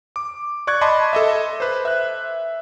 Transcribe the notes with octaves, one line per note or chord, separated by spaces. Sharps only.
D6
D5 C#6 F#6 G#6
D#5 A5 B5 C6 D6
A4 D#5 E5
B4 C5
E5 F#6